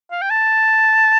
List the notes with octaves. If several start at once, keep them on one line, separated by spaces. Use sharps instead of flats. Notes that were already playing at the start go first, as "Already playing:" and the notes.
F5
G5
A5